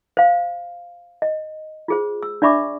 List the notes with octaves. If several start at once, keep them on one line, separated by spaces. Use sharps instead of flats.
C5 F5
D#5
F4 G#4 C5
E6
D4 D5 E5 B5 C#6 D6